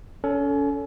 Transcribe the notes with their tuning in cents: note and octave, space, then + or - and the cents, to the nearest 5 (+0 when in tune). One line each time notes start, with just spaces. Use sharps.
C#4 +30 A4 +0